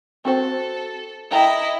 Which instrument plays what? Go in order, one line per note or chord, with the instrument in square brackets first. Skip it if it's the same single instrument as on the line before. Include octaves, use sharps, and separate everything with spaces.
[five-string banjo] C4 F#4 C5 [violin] A4
[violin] E4 D#5 [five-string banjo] A4 G5 A#5